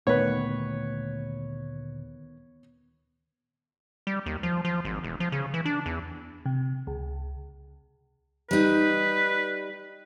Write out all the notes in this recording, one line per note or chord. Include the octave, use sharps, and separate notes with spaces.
D2 A#2 D#3 A3 B3 B4 C#5 C#6
G3
D#2
F3
F3
G#1
E1
F3
C#3
E3
D4
E2
C3
C#2
G3 D#4 B4